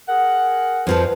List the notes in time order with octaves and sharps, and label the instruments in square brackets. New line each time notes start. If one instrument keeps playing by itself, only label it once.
[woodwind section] G#4 A#4 F#5
[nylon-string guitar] F2 F3 A4 [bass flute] B4